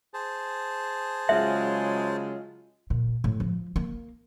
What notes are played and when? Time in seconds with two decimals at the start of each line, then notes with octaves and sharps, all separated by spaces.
0.14 G#4 C5 A5
1.29 C#3 F#3 G#3 F4 E5 F#5
2.90 A#2
3.24 A2
3.40 F3
3.76 A#3